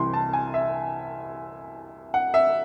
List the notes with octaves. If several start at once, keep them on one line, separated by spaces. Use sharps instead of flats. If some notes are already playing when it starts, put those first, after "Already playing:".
Already playing: C2 C3 E3 C6
A5
G#5
E5
F#5
E5